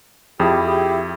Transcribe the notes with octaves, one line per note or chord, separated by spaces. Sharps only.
F2 E4 G4 G#4
G4 G#4